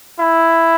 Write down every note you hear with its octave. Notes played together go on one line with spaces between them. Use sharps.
E4